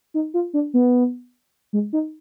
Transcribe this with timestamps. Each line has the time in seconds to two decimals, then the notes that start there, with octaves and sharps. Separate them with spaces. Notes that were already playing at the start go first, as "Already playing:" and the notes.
0.14 D#4
0.34 F4
0.54 D4
0.74 B3
1.73 G#3
1.93 D#4